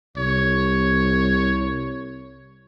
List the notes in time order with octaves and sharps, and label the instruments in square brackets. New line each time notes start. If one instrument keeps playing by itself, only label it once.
[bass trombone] C2 [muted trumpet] C#5